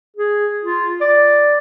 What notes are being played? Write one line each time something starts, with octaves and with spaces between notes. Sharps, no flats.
G#4
F4
D5